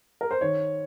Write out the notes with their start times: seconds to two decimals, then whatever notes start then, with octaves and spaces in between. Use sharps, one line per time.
0.21 A#4
0.31 C5
0.41 D#3 C#5